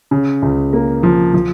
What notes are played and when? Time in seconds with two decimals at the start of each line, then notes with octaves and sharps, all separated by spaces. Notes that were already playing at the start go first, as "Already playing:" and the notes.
0.11 C#3
0.42 C#2
0.73 A#3
1.03 F3
1.34 F3